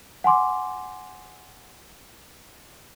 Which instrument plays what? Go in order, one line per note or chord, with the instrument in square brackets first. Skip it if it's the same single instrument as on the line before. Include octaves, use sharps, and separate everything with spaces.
[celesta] F#5 G#5 C6 D6